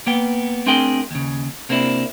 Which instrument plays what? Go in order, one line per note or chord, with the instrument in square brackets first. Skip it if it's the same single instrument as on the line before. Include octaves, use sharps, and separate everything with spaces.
[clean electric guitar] A#3 B3 G5
A3 C4 D4 G#4 A#4 G5
D#2 C#3
C3 A#3 C4 D4 E4